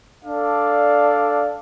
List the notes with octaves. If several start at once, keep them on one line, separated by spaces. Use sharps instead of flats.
D4 A4 D5 F5